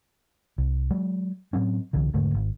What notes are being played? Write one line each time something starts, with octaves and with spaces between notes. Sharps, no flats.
C2
F#3 G#3
A2 F#3 C4 C#4
C2 D3 E3
E1 G#2 D3 A3
G#1